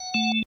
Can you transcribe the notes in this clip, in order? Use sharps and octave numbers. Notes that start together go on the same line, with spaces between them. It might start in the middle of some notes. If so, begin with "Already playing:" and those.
Already playing: F#5
A3